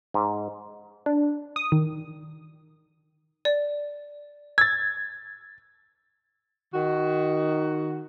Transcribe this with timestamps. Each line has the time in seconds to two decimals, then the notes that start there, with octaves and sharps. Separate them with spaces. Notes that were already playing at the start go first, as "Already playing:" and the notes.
0.14 G#2
1.06 D4
1.56 D#6
1.72 D#3
3.45 D5
4.58 E6 G#6 A6
6.74 D#3 F#4